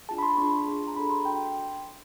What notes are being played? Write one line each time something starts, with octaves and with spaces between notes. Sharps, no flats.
D4 F4 G#4 A5
B5
C6
D4 F4 G#4 C#6
D4 F4 G#4
A#5
D4 F#4 A4 B5
C6
D4 F#4 A4 G5
G5